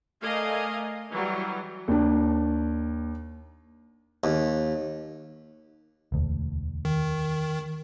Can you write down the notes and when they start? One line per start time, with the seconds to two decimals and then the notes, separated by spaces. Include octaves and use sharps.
0.23 A3 A#4 D5 D#5 F5 G#5
1.09 E3 F#3 G3
1.88 D#2 D4
4.24 D#2
6.12 E1 D2
6.85 D#3